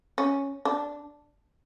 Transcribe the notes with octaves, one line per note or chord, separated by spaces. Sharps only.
C#4
D4